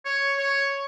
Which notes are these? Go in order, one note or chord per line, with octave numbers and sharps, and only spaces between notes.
C#5
C#5